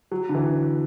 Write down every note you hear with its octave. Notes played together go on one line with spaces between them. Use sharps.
F#3
D3
E3